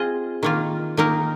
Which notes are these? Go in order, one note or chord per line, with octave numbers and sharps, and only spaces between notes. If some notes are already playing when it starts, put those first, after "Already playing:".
Already playing: C4 F4 G#4 D#5
D#3 A#3 F4
D#3 A#3 D#4 A#4